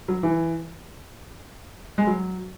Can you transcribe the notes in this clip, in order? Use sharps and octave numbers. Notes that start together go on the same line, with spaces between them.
F#3
E3
G#3
F#3